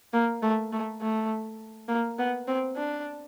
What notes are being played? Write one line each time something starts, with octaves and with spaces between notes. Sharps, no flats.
A#3
A3
A3
A3
A#3
B3
C4
D4